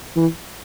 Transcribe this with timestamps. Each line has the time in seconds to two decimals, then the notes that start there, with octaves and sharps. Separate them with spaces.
0.16 E3